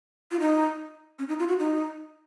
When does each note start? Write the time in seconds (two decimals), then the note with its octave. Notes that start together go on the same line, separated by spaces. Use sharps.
0.32 F4
0.40 D#4
1.19 C#4
1.29 D#4
1.39 F4
1.48 F#4
1.59 D#4